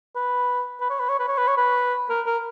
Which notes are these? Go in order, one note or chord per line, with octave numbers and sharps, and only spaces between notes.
B4
B4
C#5
B4
C#5
B4
C#5
B4
C#5
B4
A#4
A#4